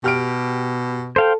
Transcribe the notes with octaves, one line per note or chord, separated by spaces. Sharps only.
B2 G4 F6 D7
A4 C5 F5 G5